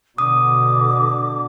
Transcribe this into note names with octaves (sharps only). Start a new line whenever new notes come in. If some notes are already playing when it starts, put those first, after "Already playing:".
B2 D3 D6 D#6